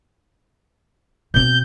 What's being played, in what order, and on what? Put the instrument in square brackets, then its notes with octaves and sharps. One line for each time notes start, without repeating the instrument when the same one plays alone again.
[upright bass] B2 C4 [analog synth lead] G6